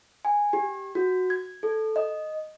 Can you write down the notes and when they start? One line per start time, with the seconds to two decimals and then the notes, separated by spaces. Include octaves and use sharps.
0.25 G#5
0.53 G4
0.95 F#4
1.30 G#6
1.63 A4
1.96 D#5